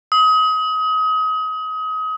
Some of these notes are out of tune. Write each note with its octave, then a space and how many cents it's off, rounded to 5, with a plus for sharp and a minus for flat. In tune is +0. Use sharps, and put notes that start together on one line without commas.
D#6 +30